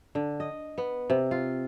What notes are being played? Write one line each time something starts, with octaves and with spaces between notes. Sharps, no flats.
D3
D#5
B3
C3
F4